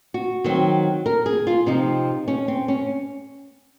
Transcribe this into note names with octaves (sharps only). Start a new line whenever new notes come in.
F#4
D#3 F#3 C4
A#4
G#4
F4
C3 F3 C4 D#4
C#4
C4
C#4